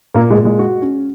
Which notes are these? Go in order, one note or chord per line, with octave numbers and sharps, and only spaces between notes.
A#2 A#3
G#3
A#2
G#3
F#4
C#4